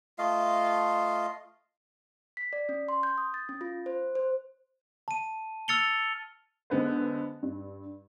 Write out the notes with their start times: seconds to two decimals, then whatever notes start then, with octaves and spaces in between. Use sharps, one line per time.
0.18 A3 F4 D#5 F5
2.37 B6
2.53 D5
2.69 C#4
2.88 C6
3.03 G6
3.18 D#6
3.34 A6
3.49 C#4
3.61 F4
3.86 C5
4.15 C5
5.08 A5 D#7
5.68 E6 F6 A6 C#7 F7 G7
6.70 D3 G#3 B3 D#4 B4 C5
7.43 G2